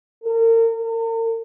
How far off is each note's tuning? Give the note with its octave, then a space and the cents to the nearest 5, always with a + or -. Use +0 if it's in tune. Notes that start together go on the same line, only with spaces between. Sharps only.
A#4 -35
A#4 -45